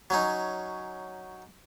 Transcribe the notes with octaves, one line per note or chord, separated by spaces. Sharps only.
F#3 C#4 D#4